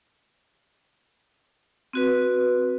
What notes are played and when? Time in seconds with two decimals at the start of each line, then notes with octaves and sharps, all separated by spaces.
1.93 C4 F#4 B4